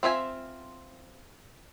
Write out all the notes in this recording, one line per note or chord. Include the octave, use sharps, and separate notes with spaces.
C4 F4 E5 G#5